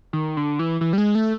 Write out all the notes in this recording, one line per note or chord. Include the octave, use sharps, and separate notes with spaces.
D#3
D3
E3
E3
G3
G#3
A3